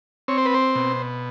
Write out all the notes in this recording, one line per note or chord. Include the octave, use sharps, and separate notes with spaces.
C4 C#5
C5
B4
C5
B2